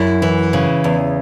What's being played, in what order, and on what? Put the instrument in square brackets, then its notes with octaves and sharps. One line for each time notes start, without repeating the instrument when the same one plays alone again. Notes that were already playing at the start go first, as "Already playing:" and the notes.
Already playing: [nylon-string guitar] F#2 E4
E3
C#3
E2